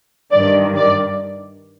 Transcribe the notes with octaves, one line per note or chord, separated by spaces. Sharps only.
G2 D#3 D5
D5